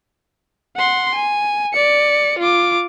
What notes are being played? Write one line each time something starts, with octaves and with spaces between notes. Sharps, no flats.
F#5 C6
G#5
D5 C#7
F4 D6